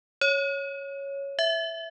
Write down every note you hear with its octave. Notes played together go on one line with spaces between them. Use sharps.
C#5
E5